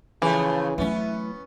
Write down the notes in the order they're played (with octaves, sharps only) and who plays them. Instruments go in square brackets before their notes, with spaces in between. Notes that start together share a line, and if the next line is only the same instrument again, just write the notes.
[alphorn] C#3 [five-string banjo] E3 [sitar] F3 A3 G#4
[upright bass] F#3 A3 [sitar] B3 C#4 [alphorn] E4